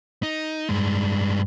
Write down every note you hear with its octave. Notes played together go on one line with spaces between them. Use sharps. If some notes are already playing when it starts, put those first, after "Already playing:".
D#4
G2 G#3